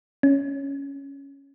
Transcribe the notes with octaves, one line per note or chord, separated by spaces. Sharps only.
C#4